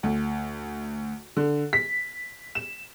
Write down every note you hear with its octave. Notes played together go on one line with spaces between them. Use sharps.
D2
D3
B6
E7